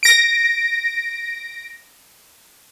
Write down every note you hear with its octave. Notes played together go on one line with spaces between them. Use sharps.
A#6 D7